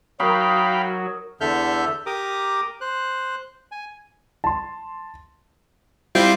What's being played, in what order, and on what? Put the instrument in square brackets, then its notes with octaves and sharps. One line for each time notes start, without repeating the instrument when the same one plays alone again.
[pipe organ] F#3 F#4 [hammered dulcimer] D#4 A#4 [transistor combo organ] F5 G5 B5
[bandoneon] E2 D3 A4 E5 F6 G6
G4 A#4 A#5 D6 D#6
C5 F#6
G#5
[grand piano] A5 C6
[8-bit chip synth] G3 E4 F4 [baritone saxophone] C4